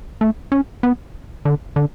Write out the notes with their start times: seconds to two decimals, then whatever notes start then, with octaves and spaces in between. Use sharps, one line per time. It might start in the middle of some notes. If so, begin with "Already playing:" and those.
0.21 A3
0.52 C#4
0.83 B3
1.45 D3
1.76 D3